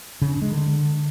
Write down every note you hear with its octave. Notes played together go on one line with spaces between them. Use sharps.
C#3
D4
G#3
D3